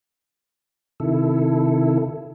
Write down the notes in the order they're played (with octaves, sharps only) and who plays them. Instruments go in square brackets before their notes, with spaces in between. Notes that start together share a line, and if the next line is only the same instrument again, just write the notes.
[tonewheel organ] C3 D#3 E4 A4